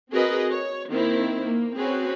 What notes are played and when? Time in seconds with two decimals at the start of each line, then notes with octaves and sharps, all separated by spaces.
0.11 C4 F#4 G#4 A#4 B4 D#5
0.50 C#5
0.90 D#3 A#3 C4 E4
1.42 A#3
1.78 C4 C#4 F#4 G#4 B4